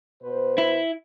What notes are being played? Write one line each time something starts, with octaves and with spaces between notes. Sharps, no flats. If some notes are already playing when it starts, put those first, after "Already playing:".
B2 B4 C5
E4